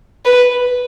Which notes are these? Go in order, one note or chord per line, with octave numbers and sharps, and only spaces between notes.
B4